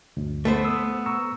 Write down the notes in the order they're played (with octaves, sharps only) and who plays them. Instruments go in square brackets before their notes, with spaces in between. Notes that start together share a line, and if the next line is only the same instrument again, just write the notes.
[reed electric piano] D2 G2
[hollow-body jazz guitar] A3 B3 C5
[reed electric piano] D#6 E6
A#5 C#6 E6